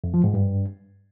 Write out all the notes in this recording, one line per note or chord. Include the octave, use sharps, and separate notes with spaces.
F2
F3
G#2
G2